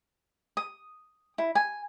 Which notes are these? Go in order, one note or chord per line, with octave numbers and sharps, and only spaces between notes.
D#6
E4
G#5